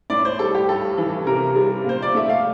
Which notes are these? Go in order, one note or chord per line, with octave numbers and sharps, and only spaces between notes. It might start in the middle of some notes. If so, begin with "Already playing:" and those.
A2 D5
C5
G3 A4
G4
G2 A4
E3
C3 A#4
G3
A#2 C5
D5
A3 E5
F5